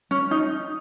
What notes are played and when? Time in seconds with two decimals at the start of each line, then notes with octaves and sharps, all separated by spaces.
0.11 C#4
0.31 D#4